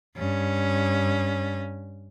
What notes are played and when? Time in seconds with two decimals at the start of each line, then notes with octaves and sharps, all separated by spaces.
0.17 G2 C#4